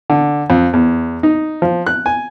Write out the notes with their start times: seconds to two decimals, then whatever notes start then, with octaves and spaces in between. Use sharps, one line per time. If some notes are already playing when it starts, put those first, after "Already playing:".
0.10 D3
0.50 F2
0.73 E2
1.23 D#4
1.62 F3
1.87 F#6
2.06 G#5